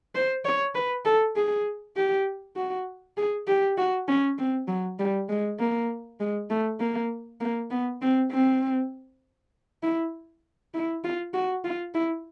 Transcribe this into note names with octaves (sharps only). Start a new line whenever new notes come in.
C5
C#5
B4
A4
G#4
G4
F#4
G#4
G4
F#4
C#4
C4
F#3
G3
G#3
A#3
G#3
A3
A#3
A#3
B3
C4
C4
E4
E4
F4
F#4
F4
E4